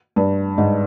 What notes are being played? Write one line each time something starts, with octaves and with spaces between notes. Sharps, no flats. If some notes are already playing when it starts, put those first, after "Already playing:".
G2
G#2